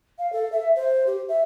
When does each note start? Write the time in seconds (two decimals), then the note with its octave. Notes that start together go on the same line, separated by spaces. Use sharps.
0.19 F5
0.33 A4
0.52 E5
0.76 C5
1.07 G4
1.29 E5